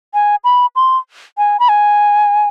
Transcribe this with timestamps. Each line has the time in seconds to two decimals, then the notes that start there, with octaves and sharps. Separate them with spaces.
0.14 G#5
0.44 B5
0.76 C6
1.38 G#5
1.60 B5
1.69 G#5